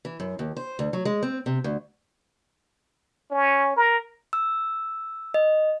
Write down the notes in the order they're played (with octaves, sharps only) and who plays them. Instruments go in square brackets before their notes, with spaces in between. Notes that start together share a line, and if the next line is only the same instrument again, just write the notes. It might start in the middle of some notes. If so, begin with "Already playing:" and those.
[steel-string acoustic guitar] E3
F#2
D#2
C5
D2
F#3
G#3
C4
C3
D2
[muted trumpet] C#4
A#4
[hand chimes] E6
D#5